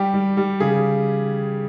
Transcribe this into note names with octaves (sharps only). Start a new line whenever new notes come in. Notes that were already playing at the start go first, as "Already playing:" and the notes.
Already playing: G3 G4
G3
G3
C#3 G#4